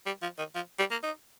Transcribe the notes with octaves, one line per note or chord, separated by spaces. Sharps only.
G3
F3
D#3
F3
G3
A#3
D#4